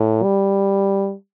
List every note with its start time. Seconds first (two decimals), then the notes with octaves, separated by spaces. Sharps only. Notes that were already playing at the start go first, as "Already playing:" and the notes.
Already playing: A2
0.23 G3